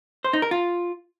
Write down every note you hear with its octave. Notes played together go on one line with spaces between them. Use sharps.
C5
D#4
A#4
F4